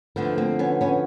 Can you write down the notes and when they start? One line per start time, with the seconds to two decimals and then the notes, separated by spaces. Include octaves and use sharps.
0.16 D2 D3 F3 A3 B3
0.38 A#3 C4
0.59 B3 C#4
0.81 B3 C#4